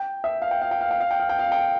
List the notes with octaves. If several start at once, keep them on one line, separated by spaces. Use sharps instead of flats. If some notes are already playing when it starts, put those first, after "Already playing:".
Already playing: G5
E5
F5
G5
F5
G5
F5
G5
F5
G5
F5
G5
F5
G5